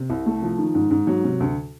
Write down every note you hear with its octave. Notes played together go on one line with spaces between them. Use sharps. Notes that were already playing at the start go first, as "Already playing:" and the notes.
Already playing: C3
C2
A3
F3
D#3
G#2
G#2
F#3
C3
D2